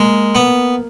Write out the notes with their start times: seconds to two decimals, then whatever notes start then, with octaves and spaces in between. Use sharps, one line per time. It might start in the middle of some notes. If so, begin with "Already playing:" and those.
Already playing: G#3 A#3
0.35 B3